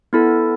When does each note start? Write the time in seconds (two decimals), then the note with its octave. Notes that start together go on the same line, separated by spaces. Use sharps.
0.13 B3 E4 A4